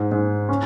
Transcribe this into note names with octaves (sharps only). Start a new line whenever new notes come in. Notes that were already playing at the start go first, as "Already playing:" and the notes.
Already playing: G#2
G#2
C#4